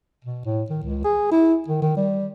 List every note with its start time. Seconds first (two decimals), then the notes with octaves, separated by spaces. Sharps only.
0.24 B2
0.45 A2
0.70 D#3
0.83 C#2
1.04 G#4
1.32 E4
1.68 D#3
1.82 D#3
1.97 G3